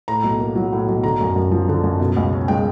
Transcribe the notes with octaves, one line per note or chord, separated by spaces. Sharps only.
A2 A#5
B1
A#3
F#3
A2
B1
D3 A#5
F#2
F#2
F3
D3
F#2
B2
C#2
C#4
G#3 G5